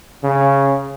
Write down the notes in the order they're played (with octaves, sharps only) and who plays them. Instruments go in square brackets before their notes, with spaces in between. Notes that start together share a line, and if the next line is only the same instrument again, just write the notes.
[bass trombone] C#3